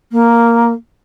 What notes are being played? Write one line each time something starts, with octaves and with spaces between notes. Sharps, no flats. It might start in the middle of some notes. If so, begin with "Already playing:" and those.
A#3